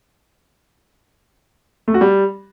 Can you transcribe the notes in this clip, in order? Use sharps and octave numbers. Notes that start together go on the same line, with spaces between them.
A3
F#4
G3